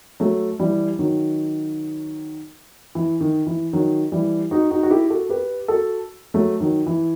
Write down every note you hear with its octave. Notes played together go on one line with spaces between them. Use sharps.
F#3 A3
E3 G3
D#3 F#3
E3
D#3
E3
D#3 F#3
E3 G3
D#4 F#4
D#4 F#4
F#4
E4 G4
F#4 A4
G4 B4
F#4 A4
F#3 A3
D#3 F#3
E3